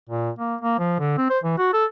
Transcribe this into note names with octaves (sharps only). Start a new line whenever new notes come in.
A#2
A#3
A#3
F3
D3
C4
C5
E3
F#4
A4